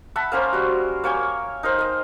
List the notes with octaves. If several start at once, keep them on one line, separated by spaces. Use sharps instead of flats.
E5 F#5 A5 B5
A#3 C#4 A#4 C5
G3 F#4
A#3 C#5 G5 G#5
D#4 A#4 C5
A#4 D#5